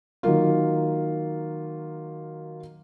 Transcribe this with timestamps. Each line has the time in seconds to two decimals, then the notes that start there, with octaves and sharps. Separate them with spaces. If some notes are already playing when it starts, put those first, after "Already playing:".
0.23 D#3 F#3 A#3 F4